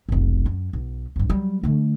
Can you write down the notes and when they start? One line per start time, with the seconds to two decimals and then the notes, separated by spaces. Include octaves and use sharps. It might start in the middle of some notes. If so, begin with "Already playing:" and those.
0.09 F1 B1
0.46 F#2
0.73 B1
1.16 C2 G2
1.29 F#3 G3
1.63 D3 A3